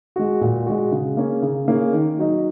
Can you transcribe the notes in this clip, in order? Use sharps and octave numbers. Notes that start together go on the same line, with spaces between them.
G#3 F#4
A#2
G#3 F#4
C#3
A#3 C#4 G#4
C#3
A#3 C#4 G#4
D#3
F#3 D#4